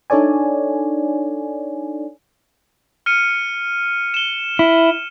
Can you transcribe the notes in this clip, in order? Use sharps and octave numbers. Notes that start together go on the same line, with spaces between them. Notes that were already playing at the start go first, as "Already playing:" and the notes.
D4 D#4 A4 C#5 D5 G#5
F6 C#7 D#7
E7 G7
E4